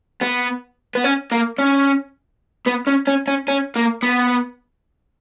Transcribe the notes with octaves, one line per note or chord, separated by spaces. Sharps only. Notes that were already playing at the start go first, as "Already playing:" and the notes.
B3
B3
C#4
A#3
C#4
B3
C#4
C#4
C#4
C#4
A#3
B3